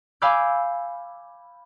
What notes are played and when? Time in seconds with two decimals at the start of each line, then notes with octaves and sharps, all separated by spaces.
0.22 F5 G#5 B5 D6 E6 G6